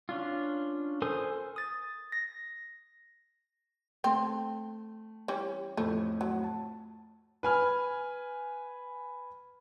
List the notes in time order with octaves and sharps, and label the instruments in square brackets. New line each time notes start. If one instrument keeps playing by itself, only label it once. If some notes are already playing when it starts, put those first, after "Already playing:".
[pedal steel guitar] C#4 D4 F4
A4 A#4 C5 G#5 D#6
[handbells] D#6 A6
A#6
[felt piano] A3 [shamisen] C4
[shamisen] E3 G3 C#4
[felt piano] F2 A2 [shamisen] A3
[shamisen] F#3
[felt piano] A5
[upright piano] B4 G#5 F6